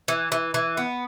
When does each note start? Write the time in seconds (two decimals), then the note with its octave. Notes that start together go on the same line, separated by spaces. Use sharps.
0.08 E3
0.32 E3
0.54 E3
0.77 B3